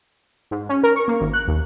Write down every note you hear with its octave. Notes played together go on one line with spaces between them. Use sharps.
G#2
C#4
A#4
C#6
A#3
G#1
F#6
D#2